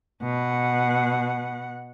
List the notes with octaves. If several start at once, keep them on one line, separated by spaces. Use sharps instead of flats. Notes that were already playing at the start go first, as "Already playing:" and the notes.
B2 F#5